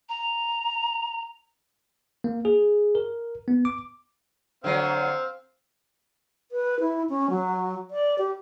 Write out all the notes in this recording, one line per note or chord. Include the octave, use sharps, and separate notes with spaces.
A#5
A#3
G#4
A#4
B3
D6
D3 F#3 C4 F5
B4
E4
C#4
F#3
D5
G4